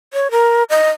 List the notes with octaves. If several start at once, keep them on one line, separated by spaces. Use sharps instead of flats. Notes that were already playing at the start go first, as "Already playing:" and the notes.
C#5
A#4
D#5